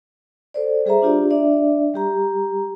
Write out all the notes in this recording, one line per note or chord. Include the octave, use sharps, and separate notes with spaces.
A4 C5 D5
G3 G#4 C5 E5 A#5
D4 F4 G4 D5
D4 D5 E5
G3 G4 A#5